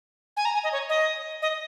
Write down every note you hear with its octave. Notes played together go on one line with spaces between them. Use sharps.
G#5
A#5
G#5
D#5
C#5
D#5
D#5